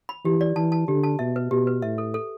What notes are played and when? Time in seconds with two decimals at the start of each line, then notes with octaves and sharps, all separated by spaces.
0.09 B5
0.25 E3 G4
0.41 D5
0.56 E3 A5
0.72 A5
0.88 D3 G4
1.04 A5
1.19 B2 E5
1.36 B4
1.51 B2 G4
1.67 B4
1.82 A2 E5
1.98 A4
2.14 A4